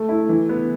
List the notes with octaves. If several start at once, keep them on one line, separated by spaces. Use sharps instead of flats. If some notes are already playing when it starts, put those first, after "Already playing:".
Already playing: A3
E4
E3
B3